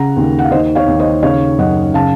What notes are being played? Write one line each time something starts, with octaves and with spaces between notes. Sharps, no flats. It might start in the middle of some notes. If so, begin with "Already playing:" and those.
Already playing: C#3 F#5 A#5
D#2
F#5
F5
D#3 C5 D#5
C#5 F5
D#2
C5 D#5
C#3 C#5 F5
F#2 D#5 F#5
C#3 F5 A5